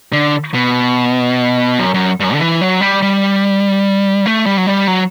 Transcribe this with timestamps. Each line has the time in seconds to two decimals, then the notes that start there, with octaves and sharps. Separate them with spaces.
0.13 D3
0.54 B2
1.79 F#2
1.94 F#2
2.20 G2
2.24 F#2
2.33 D3
2.40 E3
2.61 F#3
2.81 G3
3.02 G3
4.26 A3
4.46 G3
4.58 F#3
4.67 G3
4.87 F#3